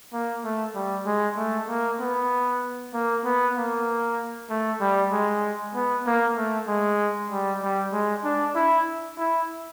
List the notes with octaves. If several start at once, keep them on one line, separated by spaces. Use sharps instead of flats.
A#3
A3
G3
G#3
A3
A#3
B3
A#3
B3
A#3
A3
G3
G#3
B3
A#3
A3
G#3
G3
G3
G#3
D4
E4
E4